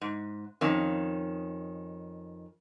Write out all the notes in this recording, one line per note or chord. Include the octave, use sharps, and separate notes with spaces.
G#2
F2 D#3 C#4